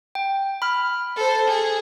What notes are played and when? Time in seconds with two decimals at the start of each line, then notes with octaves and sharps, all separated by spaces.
0.15 G5
0.62 B5 F6
1.16 A4 C5
1.47 G#4